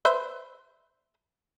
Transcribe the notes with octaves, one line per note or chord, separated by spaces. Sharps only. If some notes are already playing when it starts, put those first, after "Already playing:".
B4 C5 E5